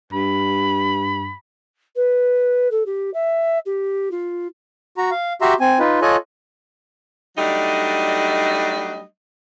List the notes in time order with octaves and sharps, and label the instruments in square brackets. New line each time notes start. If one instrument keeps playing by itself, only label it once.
[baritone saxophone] G2 [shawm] B5
[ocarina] B4
A4
G4
E5
G4
F4
[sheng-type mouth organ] F#4 A#5
F5
F#4 G4 E5 A#5 C6
C4 G#5
D#4 F4 B4
F4 A4 C#5 D#5 G#5 F#6
[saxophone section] F#3 G3 A3 D4 D#4 D#5